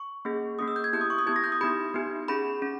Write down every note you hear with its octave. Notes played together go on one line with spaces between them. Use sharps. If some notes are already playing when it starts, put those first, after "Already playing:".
Already playing: C#6
A#3 C#4 G#4
A#3 C#4 G#4 D#6
E6
G6
G#6
B3 E4 G4 G6
D#6
C#6
D#6
B3 E4 G4 G#6
A#6
G6
D#6
B3 D#4 G4 B5
B3 D#4 G4
C#4 G#4 B5
C#4